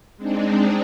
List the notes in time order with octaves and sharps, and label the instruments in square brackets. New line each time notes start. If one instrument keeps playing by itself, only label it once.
[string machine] G#3 C4 D4 D#4